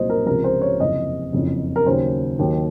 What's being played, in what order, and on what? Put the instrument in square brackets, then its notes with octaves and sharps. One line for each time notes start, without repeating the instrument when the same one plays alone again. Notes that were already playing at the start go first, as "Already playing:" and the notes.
Already playing: [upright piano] C2 A#2 F#3 C5 D#5
A#4
C#2 C3 F3 A#4
C5
C#5
F#1 F2 C3 D#5
F#1 F2 C#3
A#4
D#2 C#3 F#3 C5
D#2 D#3 F#3